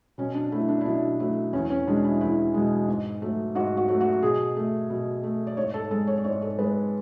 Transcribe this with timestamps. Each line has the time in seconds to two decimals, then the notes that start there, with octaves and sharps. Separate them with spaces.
0.18 B2 C#4
0.35 D4
0.52 F#3 A3 E4
0.69 D4
0.81 E4
0.85 B2 D4
1.20 F#3 A3 E4
1.53 E2 C#4
1.70 C#4
1.87 B2 G#3 D4
2.04 E4
2.21 E2 E4
2.54 B2 G#3
2.87 G#2
3.22 F#3 A3
3.55 G#2 F#4
3.77 F#4
3.88 F#3 A3
4.01 F#4
4.22 B2 G#4
4.57 A3
4.90 B2
5.23 A3
5.47 D5
5.57 G#2 C#5
5.74 A4
5.91 G#3 A4
6.07 C#5
6.17 D5
6.24 G#2 C#5
6.42 A4
6.58 G#3 B4